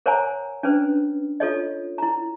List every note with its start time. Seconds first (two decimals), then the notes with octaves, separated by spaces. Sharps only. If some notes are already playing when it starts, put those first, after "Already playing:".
0.06 A#4 C5 C#5 F#5 G#5 A#5
0.63 C#4 D4 B4 C5
1.40 F4 A4 C#5 D#5
1.98 E4 A#5